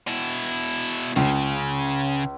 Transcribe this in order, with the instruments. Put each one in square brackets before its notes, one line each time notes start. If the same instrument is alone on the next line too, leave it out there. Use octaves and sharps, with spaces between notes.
[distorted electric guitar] B2 E4
[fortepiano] C#2 [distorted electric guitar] C#3